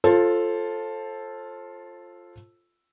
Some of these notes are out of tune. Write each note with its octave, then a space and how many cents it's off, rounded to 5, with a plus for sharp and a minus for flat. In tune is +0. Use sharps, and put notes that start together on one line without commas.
F4 +0 A4 +0 C5 +30